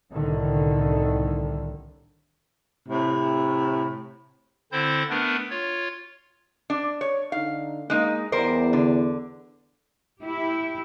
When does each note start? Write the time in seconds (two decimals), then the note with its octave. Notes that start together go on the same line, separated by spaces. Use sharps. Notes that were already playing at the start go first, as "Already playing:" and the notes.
0.10 C2 A2 D3 D#3
2.89 A2 C3
4.72 D3 C4 E4 C5 G6
5.10 A3 B3 D4 A#4 B4
5.50 F4 C#5
6.70 D4
7.01 C#5
7.32 D3 D#4 F5
7.90 G#3 A#3 D#4
8.32 E2 G3 A#4 C5
8.73 D3
10.22 E4 G4